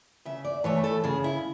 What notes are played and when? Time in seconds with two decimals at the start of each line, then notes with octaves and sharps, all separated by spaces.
0.25 C#3 E5
0.44 D5
0.64 E3 A3 C#5
0.84 A4
1.04 C#3 G#4
1.24 E4